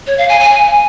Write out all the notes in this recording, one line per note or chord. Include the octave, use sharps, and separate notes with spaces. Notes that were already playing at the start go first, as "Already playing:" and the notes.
C#5
F5
G#5
G#5